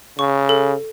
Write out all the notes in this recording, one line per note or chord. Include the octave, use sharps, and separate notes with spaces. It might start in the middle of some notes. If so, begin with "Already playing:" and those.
C#3 C#6
A4